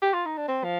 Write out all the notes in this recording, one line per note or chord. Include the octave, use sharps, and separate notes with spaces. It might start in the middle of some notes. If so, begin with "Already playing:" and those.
G4
F4
D#4
D4
C4
F3